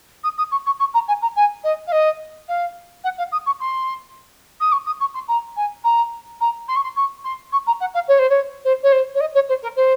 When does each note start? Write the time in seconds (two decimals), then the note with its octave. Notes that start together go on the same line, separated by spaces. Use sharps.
0.24 D#6
0.38 D#6
0.52 C#6
0.66 C#6
0.80 C#6
0.94 A#5
1.08 G#5
1.22 A#5
1.36 G#5
1.64 D#5
1.87 F5
1.92 D#5
2.49 F5
3.04 F#5
3.18 F5
3.32 D#6
3.46 C#6
3.60 C6
4.61 D#6
4.72 C#6
4.86 D#6
5.00 C#6
5.15 C6
5.28 A#5
5.57 G#5
5.84 A#5
6.41 A#5
6.69 C6
6.76 C#6
6.84 C6
6.96 C#6
7.25 C6
7.52 C#6
7.67 A#5
7.81 F#5
7.94 F5
8.08 C#5
8.19 C5
8.30 C#5
8.65 C5
8.83 C#5
8.92 C5
9.15 C#5
9.21 D#5
9.35 C#5
9.49 C5
9.63 A#4
9.76 C5